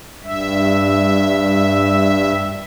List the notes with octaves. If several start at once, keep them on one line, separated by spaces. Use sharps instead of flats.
G2 E5